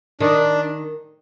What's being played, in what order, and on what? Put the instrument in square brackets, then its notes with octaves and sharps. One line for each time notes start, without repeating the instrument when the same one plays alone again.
[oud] D#3 [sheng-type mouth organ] D4